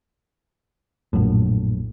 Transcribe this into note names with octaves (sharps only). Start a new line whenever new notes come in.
A#1 F#2 A2